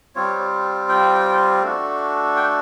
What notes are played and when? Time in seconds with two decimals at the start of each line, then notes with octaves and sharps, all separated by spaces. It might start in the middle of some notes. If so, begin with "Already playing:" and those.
0.15 G3 C4 F4 C#5
0.89 G5
1.62 A3 D4 F#4
2.36 G5